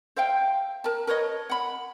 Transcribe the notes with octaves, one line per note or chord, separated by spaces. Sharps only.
C5 E5 F5 G5
A#4 A5
A#4 B4 C#5 D#5
F#5 B5